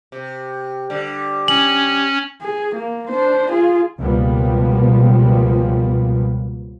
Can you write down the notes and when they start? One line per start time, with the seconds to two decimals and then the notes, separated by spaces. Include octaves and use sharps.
0.12 C3
0.90 D3 G3
1.48 C#4 F#7
2.42 G#4
2.76 A#3
3.09 D4 C5
3.51 F4 G#4
3.99 C#2 B2 F3 G3 A#3 B3